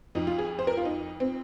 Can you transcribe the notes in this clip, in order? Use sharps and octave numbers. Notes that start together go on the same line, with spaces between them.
F2 F3 D#4
F4
G#4
C5
A#4
F4
D#4
C4